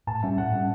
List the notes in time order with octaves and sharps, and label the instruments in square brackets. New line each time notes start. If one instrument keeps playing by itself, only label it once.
[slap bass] A2 [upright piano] A5
[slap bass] G3 C#4 [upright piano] E5
[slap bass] A2 [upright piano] F#5
[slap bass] G3 C#4 [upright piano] F#5